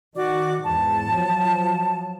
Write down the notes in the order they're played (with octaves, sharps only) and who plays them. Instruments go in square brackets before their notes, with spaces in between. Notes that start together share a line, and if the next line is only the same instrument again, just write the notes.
[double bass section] D#3 [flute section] F#4 D5 D6
[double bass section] E2 G#2 [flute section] A5
[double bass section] F3 F#3